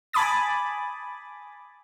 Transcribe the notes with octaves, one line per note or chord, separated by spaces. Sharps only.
G#5 A5 B5 D6 D#6 A6